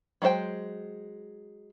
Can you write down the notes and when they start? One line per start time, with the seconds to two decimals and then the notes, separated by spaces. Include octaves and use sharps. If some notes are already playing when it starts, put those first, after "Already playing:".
0.22 F#3 G#3 F4 C5 G5